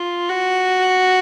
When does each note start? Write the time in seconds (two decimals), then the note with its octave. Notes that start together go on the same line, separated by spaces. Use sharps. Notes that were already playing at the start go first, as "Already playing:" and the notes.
Already playing: F4
0.29 F#4